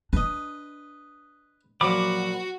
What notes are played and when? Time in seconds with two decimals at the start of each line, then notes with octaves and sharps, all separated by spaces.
0.13 D4 B4 D#5
1.81 A#2 F3 F#3 F#4 B5 D6